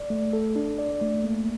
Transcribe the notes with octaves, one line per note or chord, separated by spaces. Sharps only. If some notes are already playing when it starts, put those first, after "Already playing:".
Already playing: D5
A3
A4
D4
D5
A3
A#3